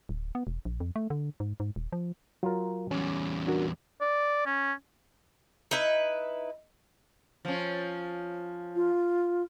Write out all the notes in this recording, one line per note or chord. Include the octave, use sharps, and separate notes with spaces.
D1
B3
E1
A#1
F2
A3
D3
G#2
G#2
D#1
F3
F#3 F4 A#4
E2 G3 C#4
D4 F#4 A#4
D5
C#4
D#4 E4 B4
F3 C#4
F4